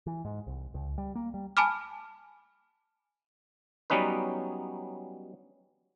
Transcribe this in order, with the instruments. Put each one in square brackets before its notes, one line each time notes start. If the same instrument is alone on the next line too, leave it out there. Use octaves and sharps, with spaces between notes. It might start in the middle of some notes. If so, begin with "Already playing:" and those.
[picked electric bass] E3
G#2
C2
C#2
G3
A#3
G3
[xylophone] G#5 A5 B5 D6 F6
[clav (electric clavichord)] F#3 G3 B3 C#4 D#4 B4